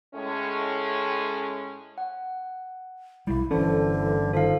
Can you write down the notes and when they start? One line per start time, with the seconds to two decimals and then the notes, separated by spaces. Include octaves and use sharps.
0.15 A2 G#3 C#4
1.98 F#5
3.27 B1 G3 E4
3.51 G1 D3 E3 C#4 A4 C5
4.33 D#3 F3 A4 F5